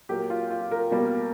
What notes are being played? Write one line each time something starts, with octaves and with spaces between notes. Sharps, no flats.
A#2 F#3 A#3 G4
F4
F4
A#4
B2 G3 A#3